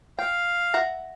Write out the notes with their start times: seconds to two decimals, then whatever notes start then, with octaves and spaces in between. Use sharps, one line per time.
0.19 F5 G5
0.74 E5 F#5 A#5